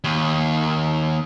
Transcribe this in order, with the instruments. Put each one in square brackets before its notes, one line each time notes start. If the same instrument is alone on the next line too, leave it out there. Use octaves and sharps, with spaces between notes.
[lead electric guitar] D#2